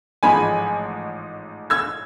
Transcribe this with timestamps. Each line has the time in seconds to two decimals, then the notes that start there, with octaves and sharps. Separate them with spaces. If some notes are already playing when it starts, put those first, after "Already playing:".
0.23 A1 G#2 F3 G#3 G#5 B5
1.70 E6 G#6